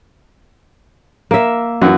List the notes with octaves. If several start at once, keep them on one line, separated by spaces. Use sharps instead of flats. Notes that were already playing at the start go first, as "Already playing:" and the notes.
A#3 E5
F#2 E3 F#4